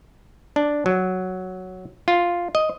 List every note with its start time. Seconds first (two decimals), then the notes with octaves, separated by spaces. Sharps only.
0.56 D4
0.86 F#3
2.08 F4
2.55 D#5